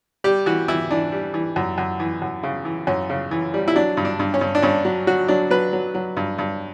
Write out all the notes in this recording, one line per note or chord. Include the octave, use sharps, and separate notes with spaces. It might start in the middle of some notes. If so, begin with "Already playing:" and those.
G3 G4
E3 F#4
E3 E4
E3 D4
G3
E3
F#2
F#2
E3
F#2
C#3
E3
F#2 C#4
C#3
E3
G3
E4
F#3 D4
G2
D4
G2
C#4
G2
D4
G2 C#4
F#3
F#3 F#4
F#3 D4
F#3 B4
F#3
F#3
G2
G2